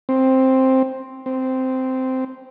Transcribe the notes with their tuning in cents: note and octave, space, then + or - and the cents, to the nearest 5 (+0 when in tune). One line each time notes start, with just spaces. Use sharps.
C4 +5
C4 -10